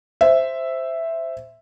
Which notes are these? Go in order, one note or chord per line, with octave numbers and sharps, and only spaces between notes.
C5 E5